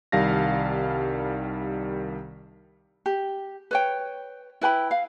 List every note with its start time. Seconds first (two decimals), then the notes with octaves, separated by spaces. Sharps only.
0.12 C2 D#3 G3 F5 A5 A#6
3.06 G4
3.71 B4 C#5 G5
4.61 E4 B4 G5 B5
4.91 F5